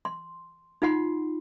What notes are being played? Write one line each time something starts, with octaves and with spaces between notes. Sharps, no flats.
C6
D#4 F4 F#5 C6